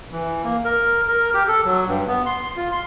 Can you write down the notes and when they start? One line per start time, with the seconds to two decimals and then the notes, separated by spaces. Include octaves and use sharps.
0.12 E3
0.43 A#3
0.65 A#4
1.08 A#4
1.34 G4
1.48 A4
1.65 F#3
1.87 G2
2.08 B3
2.26 C6
2.56 F4
2.72 C6